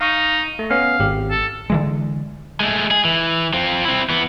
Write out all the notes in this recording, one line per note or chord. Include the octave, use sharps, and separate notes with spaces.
D#4 F5 C#6
A3
B3 C#4 F5
G#1 G4
A4
D3 E3 G#3
G#3 A3
G#4
E3
F3 C4
C4 E4
E3 B3